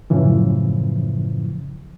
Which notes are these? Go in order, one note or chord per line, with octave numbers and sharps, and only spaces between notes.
F#2 A2 C#3 E3 F3